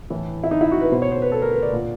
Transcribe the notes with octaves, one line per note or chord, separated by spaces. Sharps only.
A2 E3
E4
D#4
E4
F#4
B4
B2 C5
C#5
C5
B4
A4
A#4
B4
D5
A#2